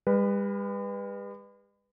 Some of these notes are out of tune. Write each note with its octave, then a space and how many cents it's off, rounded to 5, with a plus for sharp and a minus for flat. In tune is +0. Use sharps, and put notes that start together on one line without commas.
G3 +45 B4 +0